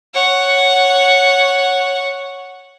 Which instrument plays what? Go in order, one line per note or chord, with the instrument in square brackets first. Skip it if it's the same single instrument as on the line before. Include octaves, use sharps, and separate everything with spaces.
[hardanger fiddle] C#5 F#5